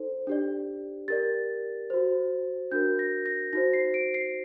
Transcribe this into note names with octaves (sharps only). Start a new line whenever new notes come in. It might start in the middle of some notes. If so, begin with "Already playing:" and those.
Already playing: D#4 A4 C5
D4 G4 D5
G4 A#4 D5 A6
F#4 C5
D4 F#4 A#4 G6
A#6
A#6
D#4 F#4 C5 A#6
C7
D7
C7